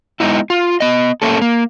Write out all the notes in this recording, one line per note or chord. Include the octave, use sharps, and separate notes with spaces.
G#3 B3 D#4 E4
F4
B3 D#5
A3 A#3 C#4 A4
A#3